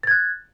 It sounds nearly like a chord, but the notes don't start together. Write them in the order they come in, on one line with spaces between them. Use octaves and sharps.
A6 G#6 F#6